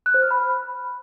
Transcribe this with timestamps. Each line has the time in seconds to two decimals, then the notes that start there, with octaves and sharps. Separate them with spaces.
0.06 F#6
0.14 C5
0.22 F6
0.31 B5